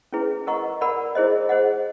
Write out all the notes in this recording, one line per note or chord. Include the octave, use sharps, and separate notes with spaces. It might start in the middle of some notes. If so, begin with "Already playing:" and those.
C#4 E4 G#4 B4
A#4 D#5 F#5 A#5 C#6
A#4 D5 F#5 B5
E4 G#4 C5 D#5
G#4 C5 D#5 F#5